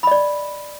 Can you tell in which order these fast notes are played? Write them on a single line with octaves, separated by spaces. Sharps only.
B5 D#5 D5